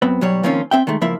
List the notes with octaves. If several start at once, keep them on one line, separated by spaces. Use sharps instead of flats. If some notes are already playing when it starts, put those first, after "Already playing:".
F#2 B3 C4
B1 F#3 G3 C#5
D#3 F3 A#3 C4 C#4 F4
C4 E5 G5
D#3 G#3 A3
C#2 F3 A#3 E4 E5